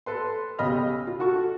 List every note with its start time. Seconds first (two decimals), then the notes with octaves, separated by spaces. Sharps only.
0.06 A4 B4 C6
0.59 B1 C#3 G4 D#5 B5 F6
1.07 F4
1.19 F4 F#4 A4 C#6